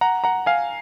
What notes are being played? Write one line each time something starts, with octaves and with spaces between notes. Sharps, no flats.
F#5 A#5
F#5 A#5
F5 G#5